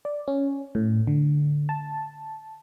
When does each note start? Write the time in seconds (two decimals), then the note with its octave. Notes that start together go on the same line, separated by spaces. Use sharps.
0.05 D5
0.28 C#4
0.75 A2
1.07 D3
1.69 A5